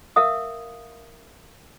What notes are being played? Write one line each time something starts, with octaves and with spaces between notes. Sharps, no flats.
A#4 E5 F5 D#6